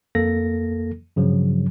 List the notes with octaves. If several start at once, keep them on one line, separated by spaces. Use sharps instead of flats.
F2 A#3 A4 A#6
G2 C#3 F3 F#3